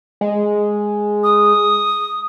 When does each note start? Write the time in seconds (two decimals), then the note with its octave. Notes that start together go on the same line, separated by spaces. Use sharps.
0.21 G#3
1.23 D#6